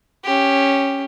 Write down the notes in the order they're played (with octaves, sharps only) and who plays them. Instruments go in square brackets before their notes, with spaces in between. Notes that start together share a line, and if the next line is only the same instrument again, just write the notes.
[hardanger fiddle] C#4 G4